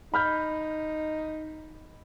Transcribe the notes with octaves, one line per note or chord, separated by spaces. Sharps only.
D#4 B5 F6 G6